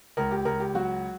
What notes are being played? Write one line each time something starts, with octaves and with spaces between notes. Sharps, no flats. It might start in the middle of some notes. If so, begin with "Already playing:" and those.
C#2 A#4
G4
C#2 A#4
G4
F#3 F#4